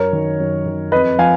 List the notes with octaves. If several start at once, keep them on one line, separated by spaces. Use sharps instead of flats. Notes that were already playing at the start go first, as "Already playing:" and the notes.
Already playing: F#2 A#4 C#5
D#3
F#2
D#3
F2 B4 D#5
F3 F5 G#5